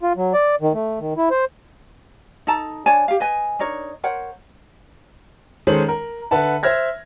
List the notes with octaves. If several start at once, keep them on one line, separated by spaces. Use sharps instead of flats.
F4
F#3
D5
D#3
A3
D#3
E4
C5
D#4 A4 A5 A#5
D4 C#5 G#5 A5
G4 F5
B4 D#5 G#5
D4 D#4 A#4 C#5
A#4 C5 C#5 F#5
D#3 G#3 C#4 A4 C5 F#7
A#4
D3 B4 E5 F#5 A5 B5
C5 E5 F6 G#6 A#6